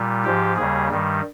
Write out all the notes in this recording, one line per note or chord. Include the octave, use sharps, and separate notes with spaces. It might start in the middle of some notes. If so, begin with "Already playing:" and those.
Already playing: A#2 G3
G#2 F3 G4
D#2 C#3 G3 G#4
G2 D#3 G3